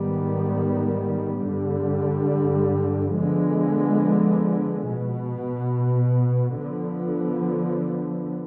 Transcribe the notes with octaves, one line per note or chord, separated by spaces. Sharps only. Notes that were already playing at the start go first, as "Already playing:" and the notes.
Already playing: G#2 D#3 G3 B3
G2 D3 G3
D3 F3 G#3 B3
B2 B3
D3 F3 B3